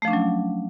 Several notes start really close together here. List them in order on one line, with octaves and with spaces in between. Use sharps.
A3 F3 D4 C#4 F#3